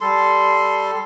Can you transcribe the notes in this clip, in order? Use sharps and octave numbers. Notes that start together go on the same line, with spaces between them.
G3 A4 C6